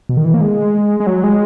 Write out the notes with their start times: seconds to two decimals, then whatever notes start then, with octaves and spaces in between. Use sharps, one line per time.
0.09 B2
0.17 D#3
0.25 E3
0.34 A#3
0.41 G#3
1.00 G#3
1.07 F#3
1.24 G#3